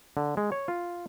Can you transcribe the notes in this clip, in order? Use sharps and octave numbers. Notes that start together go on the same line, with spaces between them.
D3
G#3
C#5
F4